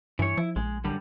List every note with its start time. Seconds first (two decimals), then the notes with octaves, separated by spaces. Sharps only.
0.19 G2 E3 C#5
0.38 F3 E4
0.56 A#1 G#3
0.84 F#2 D3 G3